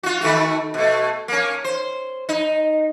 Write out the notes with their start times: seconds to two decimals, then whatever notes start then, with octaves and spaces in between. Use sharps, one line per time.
0.03 F4 F#4
0.21 D#3 A3 F#4
0.74 B2 A3
1.28 A#3 C#4
1.64 C5
2.29 D#4